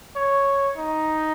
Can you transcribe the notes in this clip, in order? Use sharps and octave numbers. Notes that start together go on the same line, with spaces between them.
C#5
D#4